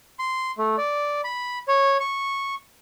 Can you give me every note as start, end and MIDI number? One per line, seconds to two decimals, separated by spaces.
0.19 0.51 84
0.58 0.76 57
0.78 1.21 74
1.24 1.59 83
1.68 1.97 73
2.00 2.55 85